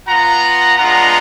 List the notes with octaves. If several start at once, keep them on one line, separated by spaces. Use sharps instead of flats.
B3 F4 F#5 A#5
G#3 B3 D4 F4 F#5 A#5